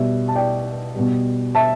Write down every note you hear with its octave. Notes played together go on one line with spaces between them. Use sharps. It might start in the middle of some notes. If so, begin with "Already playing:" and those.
Already playing: B2 G3 E5
A5
D5 G5
B2 G3
E5 A5